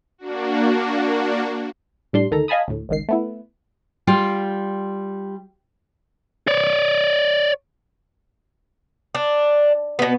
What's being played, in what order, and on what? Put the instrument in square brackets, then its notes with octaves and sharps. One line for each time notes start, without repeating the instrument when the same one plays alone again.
[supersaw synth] A#3 D4 F#4
[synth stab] A2 G3 D4 C6
D2 D#3 A4 A#5
D#5 F5 G#5 A5 B5 D#6
D2 A2
G#1 C#2 D#3 C7
A3 B3 E4
[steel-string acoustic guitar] G3 F4 G5
[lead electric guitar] C#5 D5
[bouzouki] D4
B2 B3